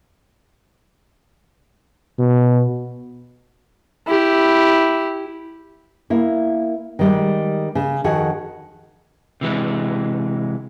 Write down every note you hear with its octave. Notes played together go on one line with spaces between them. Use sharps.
B2
E4 G4
A#3 E4
D#3 G3 G#3
C#3
F2 D#3 F#4 G#4 F#5
C3 E3 G#3